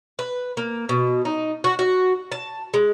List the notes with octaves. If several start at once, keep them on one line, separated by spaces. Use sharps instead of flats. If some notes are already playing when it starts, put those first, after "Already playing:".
B4
A#3
B2
D#4
F#4
F#4
A5
G#3